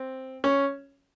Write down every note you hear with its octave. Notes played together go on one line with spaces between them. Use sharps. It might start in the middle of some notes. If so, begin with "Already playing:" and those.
Already playing: C4
C#4